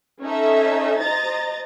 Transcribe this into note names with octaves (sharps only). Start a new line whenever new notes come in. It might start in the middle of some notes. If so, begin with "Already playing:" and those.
C#4 D#4 A4 E5
C5 D#5 A#5 A6